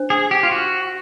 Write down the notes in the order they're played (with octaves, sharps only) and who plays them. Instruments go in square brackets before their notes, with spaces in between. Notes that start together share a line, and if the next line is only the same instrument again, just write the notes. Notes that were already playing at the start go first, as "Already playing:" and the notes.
Already playing: [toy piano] D4 C5
[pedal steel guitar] G#4
G4
F4
F#4